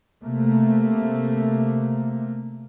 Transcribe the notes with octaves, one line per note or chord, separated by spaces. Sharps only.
C3 A3 A#3